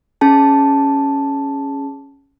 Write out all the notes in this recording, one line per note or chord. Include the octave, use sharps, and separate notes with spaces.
C#4 G#4 A5